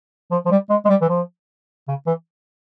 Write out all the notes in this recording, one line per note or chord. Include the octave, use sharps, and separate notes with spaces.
F3
F3
G3
G#3
G#3
G3
E3
F3
C#3
E3